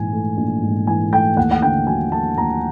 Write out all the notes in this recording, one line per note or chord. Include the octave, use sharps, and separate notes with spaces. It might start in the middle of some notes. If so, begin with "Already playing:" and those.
Already playing: A#1 G#2 E3 G#5
A3
A#1
G#2
E3 G#5
A3 G5
D#2 F#5
F#5
D3 G5
F#3 G#5
A3 A5
D#2 A#5